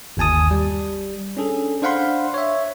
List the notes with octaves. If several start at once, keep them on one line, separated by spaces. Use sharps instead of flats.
G1 D#2 G#5 A5 D#6
G3
C#4 D4 G#4 A4
D4 C5 F5 F#5 B5 C6
C#5 E5